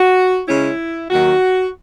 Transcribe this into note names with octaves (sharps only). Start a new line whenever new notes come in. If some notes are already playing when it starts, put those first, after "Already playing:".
Already playing: F#4
C#3 G#3 C#4 E4
D#2 D#3 F#3 F#4